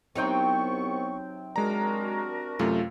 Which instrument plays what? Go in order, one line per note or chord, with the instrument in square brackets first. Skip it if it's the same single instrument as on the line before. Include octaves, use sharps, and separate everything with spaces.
[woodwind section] C2 B3 C#6 [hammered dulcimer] C3 C4 G5 [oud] F#3 D#4
[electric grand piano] G#3 A#5 [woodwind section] D4 F#4 A#4
[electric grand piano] F#2 C3 A3 [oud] F4